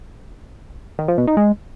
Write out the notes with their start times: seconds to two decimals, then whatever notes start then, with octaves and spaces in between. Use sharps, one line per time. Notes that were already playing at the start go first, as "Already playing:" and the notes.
0.99 D#3
1.08 F3
1.18 B2
1.27 D#4
1.37 G#3